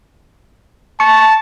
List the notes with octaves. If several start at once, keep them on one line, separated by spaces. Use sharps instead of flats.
A5 C#6